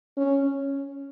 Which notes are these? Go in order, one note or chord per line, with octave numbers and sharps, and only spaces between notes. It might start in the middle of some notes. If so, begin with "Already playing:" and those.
C#4